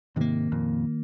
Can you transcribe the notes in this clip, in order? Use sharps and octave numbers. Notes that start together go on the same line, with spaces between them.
G#2 C3 D#3 A#3
F2 A#2